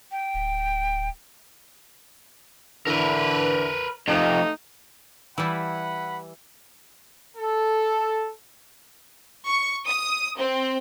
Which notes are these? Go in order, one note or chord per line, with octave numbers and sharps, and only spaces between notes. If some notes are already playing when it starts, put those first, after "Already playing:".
G5
D1
D3 E3 A#4 B4
F2 C3 A3 D#4
E3 G3 E4 F#5 B5
A4
C#6
D#6
C4